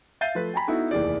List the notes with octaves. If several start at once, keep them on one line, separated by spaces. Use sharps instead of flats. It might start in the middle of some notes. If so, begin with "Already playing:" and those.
E5 F5 G6 A6 C7 D#7
F3 A3 B4
G5 G#5 A#5 B5
B3 D#4 E4 F#4 A4
F1 D#2 E3 G#4 D5